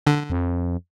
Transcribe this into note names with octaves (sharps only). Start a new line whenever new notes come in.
D3
F2